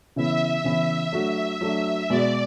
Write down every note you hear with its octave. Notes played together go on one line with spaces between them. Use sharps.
C#3 E3 B3 E4 E5
C#3 E3 B3 E4
F#3 A3 D4 F#4 E5
F#3 A3 D4 F#4
B2 G#3 B3 F#4 D5